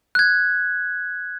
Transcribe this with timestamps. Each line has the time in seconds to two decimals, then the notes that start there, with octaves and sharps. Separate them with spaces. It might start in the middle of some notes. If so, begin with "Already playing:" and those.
0.15 F#6 G#6